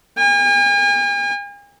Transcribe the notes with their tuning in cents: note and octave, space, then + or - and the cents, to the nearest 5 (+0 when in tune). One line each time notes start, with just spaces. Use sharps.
G#5 -45